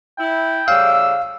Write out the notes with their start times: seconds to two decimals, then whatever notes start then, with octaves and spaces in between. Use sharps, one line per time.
0.18 E4 G5
0.68 A2 C#3 G3 F5 E6